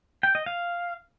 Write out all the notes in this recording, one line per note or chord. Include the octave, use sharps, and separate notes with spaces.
G5
D#5
F5